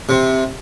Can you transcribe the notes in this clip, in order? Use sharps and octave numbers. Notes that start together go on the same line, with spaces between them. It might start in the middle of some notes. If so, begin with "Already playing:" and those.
C3